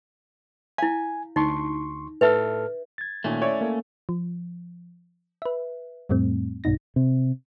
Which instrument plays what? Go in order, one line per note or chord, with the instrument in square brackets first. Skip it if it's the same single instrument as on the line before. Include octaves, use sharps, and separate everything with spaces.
[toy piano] E4 F5 [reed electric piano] G#5
[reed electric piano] D2 C6 C#6 [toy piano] D#4
[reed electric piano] A2 A4 F6 [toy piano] B4 E5
[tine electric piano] G#6 A6
[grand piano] A#2 D#3 [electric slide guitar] A3 C#4
[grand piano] E4 C#5 D5
[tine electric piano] A#3 A4
[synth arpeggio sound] F3
B4 E5
F2 A2 G3 A3 C4
B1 G2 B2 D#4 A#6
[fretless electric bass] C3